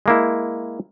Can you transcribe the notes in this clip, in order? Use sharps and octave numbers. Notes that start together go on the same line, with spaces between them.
G#3 A#3 E4